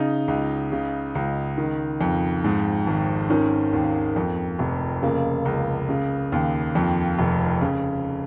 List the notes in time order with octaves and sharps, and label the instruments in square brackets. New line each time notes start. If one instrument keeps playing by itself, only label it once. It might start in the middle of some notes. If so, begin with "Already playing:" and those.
Already playing: [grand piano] C#3 D#4
C#2
C#3
C#2
D#3
F2
G#2
G#1
D#3 C#4
D#2 A#3
F2
F1
C#3 A#3
C#2
C#3
D#2
F2
F1
C#3